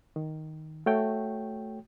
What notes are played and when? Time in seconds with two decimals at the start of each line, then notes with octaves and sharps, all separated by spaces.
0.16 D#3
0.86 A3 F#4 C#5 G5